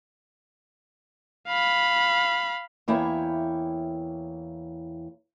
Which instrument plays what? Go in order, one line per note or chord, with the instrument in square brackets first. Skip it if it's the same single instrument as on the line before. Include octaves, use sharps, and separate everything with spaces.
[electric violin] F5 B5
[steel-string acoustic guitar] E2 A#3 E4 C#5 G5